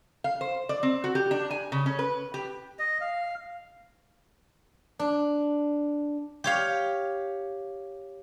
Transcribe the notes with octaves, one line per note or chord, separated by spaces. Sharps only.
F5
C5
D5
C4
F#4
G4
D4
G#5
C#3
C#4
B4
G4
D#5
F5
D4
G4 C#5 F5